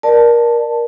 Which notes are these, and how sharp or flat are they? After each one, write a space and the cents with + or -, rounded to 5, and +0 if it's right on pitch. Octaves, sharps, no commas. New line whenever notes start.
A#4 +20 D5 +15 A5 +0